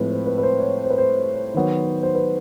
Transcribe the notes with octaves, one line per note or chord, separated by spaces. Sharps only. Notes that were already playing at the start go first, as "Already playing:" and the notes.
Already playing: A2 F3 G#3 C4 B4
C5
B4
B4
C5
C#5
C5
B4
C5
D#3 F#3 B3
C5
B4